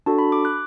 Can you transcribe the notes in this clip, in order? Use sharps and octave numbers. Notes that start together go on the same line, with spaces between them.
D4 F#4 A4 A5
B5
D6
F#6